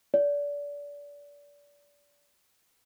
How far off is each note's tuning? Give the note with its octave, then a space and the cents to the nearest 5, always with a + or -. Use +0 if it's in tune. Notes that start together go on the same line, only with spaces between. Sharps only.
D5 -30